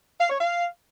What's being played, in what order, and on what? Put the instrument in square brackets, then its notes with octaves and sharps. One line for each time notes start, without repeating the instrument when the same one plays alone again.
[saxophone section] F5
C#5
F5